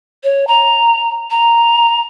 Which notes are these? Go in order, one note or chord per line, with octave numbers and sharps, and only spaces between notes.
C#5
A#5
A#5